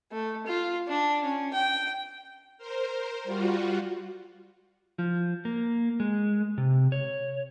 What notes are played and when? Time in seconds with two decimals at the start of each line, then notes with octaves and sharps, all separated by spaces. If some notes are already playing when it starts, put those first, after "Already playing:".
0.12 A3
0.46 F4
0.88 D4
1.24 C#4
1.54 G5
2.58 A#4 C5
3.24 G3 F4 F#4
4.98 F3
5.45 A#3
6.00 G#3
6.58 C3
6.92 C#5